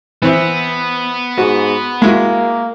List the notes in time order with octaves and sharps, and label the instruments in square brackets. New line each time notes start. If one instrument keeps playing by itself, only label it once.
[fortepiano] E3 C4 E4 [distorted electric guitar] B3
[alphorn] G#2 [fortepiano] F#4
[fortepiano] G#3 E4 F#4 [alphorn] A#3